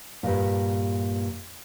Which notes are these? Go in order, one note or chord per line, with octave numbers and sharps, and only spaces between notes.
G2 A#2